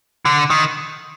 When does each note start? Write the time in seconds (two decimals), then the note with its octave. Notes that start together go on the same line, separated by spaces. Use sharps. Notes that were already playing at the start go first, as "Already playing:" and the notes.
0.25 D3
0.50 D#3